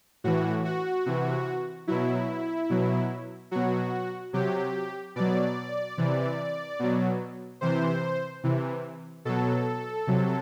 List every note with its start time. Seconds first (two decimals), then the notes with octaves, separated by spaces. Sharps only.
0.24 A2 E3 F#4
0.65 F#4
1.06 C3 E3
1.87 B2 F#3 E4
2.70 B2 F#3
3.51 B2 F#3 F#4
4.33 C3 F#3 G4
5.16 B2 F#3 D5
5.98 C3 E3
6.79 B2 F#3
7.61 C3 E3 C5
8.44 C3 E3
9.25 B2 F#3 A4
10.07 C3 F#3